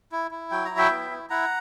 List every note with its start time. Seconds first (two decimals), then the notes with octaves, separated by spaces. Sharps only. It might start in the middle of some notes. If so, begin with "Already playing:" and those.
0.12 E4
0.31 E4
0.51 F#3 G5
0.65 A#5
0.71 E4
0.77 E5 G5
0.90 B3
1.11 E4
1.30 E4 F#5 A#5